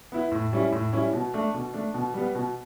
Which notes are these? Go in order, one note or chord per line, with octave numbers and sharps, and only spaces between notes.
B3 E4
A2
G3 C#4 E4
A2
G3 C#4 E4
B2
A3 D4
B2
A3 D4
B2
G3 B3
B2